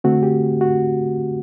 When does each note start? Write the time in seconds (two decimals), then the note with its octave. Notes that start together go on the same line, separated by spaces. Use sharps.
0.04 D3 A3 C4 F#4
0.23 G4
0.61 F#4